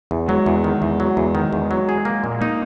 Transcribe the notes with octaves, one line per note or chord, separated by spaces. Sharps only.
E2
F#3 G#3
E2
D#3
E2
F#3
E2
D#3
E2
F#3
G#4
A#3
A#2
A#3 D#4